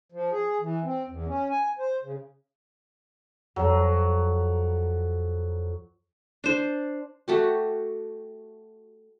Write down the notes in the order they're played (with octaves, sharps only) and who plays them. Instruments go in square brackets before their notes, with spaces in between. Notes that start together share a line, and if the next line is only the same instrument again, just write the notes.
[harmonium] F3
G#4
E3
C4
E2
C#4
G#5
C5
C#3
[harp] F2 [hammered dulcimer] F#3
[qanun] D4 C5
A3 F#4 G4